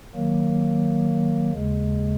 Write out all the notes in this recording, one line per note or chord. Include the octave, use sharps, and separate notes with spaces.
D#3 F#3 A#3
D#2 C#3 G#3